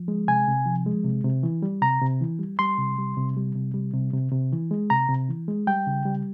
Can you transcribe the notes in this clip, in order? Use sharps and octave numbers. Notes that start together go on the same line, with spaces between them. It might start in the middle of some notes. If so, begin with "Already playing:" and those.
Already playing: F3
G#3
C3 G#5
C3
F3
G#3
C3
C3
E3
G3
C3 A#5
C3
E3
G3
G3 C6
C3
G3
C3
G3
C3
G3
C3
C3
C3
E3
G#3
C3 A#5
C3
E3
G#3
G3 G5
C#3
G3